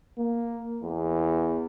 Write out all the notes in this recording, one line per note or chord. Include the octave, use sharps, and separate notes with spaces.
A#3
E2